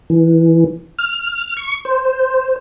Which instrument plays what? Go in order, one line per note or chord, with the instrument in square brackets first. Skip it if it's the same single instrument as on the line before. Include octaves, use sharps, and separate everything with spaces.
[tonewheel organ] E3
F6
C#6
C5